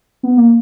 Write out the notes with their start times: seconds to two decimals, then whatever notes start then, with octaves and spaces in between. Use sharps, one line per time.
0.23 B3
0.37 A#3